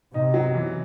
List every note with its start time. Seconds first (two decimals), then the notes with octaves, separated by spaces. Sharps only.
0.14 C3 D#4
0.34 F#3
0.54 E3